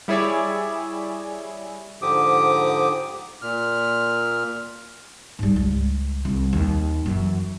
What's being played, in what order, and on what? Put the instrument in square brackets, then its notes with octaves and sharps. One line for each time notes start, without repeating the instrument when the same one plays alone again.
[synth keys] G3 E4 G#4 C#5 D5 E5
[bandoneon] G#2 D3 F3 G4 D6 D#6
A#2 F6
[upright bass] G#2 G3
C#2
C2
D#2
F#2 E3